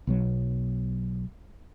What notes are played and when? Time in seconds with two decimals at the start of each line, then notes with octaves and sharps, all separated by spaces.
0.07 B1 B2 F#3